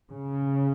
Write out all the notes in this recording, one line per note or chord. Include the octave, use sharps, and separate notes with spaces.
C#3